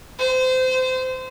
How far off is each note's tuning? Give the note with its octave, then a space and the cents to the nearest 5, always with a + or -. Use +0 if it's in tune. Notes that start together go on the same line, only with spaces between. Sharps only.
C5 -25